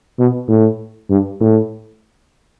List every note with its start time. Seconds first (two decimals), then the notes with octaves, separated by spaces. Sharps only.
0.19 B2
0.48 A2
1.10 G2
1.41 A2